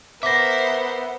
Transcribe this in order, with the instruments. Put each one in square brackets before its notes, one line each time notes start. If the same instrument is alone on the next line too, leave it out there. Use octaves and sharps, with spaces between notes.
[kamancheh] B3 [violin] A#4 C5 [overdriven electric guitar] E5 [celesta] D6 A#6